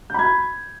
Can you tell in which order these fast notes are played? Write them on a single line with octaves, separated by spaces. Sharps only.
G6 B5 G#6